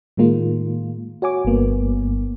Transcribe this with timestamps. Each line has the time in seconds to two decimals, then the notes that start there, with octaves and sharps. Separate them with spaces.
0.17 A2 D#3 G#3 A#3 F4
1.22 F#4 C#5 G#5 D6
1.45 G1 G2 A#3 B3